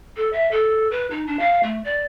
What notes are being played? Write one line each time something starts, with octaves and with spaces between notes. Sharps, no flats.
A4
E5
A4
B4
D#4
D4
F5
A3
D5